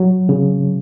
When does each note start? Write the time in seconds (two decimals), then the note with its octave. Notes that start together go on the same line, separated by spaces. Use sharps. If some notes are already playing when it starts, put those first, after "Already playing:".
Already playing: F#3
0.29 C#3